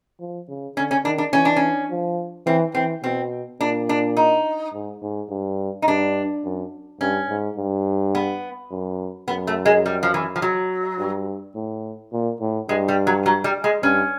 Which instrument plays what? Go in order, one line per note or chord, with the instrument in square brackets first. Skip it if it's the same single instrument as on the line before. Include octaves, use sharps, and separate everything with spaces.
[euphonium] F3
C#3
[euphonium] D3 [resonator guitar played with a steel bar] C#4
[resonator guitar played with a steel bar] C#4
[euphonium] D#3 [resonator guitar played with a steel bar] D4
[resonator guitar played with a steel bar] D4
[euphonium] E3 [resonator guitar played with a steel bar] C#4
[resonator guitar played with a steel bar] D4
C#4
[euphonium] F3
[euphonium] E3 [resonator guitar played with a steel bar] C4
[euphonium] E3 [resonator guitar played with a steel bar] C4
[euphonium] B2 [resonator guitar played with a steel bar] C4
[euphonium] A#2 [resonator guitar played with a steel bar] D4
[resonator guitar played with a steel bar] D4
D#4
[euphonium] G#2
G#2
G2
[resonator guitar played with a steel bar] D#4
[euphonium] G2 [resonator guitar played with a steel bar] D4
[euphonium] F#2
[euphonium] G2 [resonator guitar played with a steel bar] C#4
[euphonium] G#2
G2
[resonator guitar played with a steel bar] B3
[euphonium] F#2
[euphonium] F#2 [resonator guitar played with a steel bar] B3
[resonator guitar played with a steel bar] A3
G#3
G3
F3
E3
F3
F#3
[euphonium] G2
A2
A#2
A2
[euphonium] G2 [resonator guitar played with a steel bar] G#3
[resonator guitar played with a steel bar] G3
F#3
F#3
G3
G#3
[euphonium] G2 [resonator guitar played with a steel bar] C#4